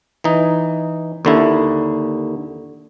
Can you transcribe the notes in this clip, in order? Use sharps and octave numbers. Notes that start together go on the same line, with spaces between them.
E3 D#4
D#2 D3 E4